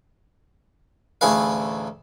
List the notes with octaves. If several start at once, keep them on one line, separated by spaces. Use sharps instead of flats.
A1 D2 E4 G#4 B4 F5